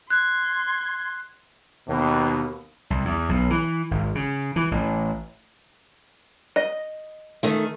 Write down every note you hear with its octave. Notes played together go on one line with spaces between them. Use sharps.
C6 F#6 G#6
D#2 B2
C2
E2
B1
E3
G#1
C#3
E3
A1
D#5
D#3 A3